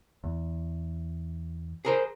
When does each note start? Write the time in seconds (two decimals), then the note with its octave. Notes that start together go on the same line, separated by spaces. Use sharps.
0.24 E2
1.85 G#4 A#4 C5